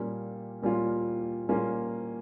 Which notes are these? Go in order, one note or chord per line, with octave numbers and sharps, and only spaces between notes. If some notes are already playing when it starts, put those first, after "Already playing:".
Already playing: A#2 G3 A#3 C#4 F4
A#2 G3 A#3 C#4 F4
A#2 G3 A#3 C#4 F4